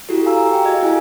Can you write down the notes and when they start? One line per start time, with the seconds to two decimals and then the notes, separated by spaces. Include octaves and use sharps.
0.09 E4 F#4 G4 A4
0.26 F5 G#5 A#5 E6
0.38 G4
0.52 G5
0.65 F#4 G#4 D#5 F5 G#6
0.83 E4 A4 D#5 G#5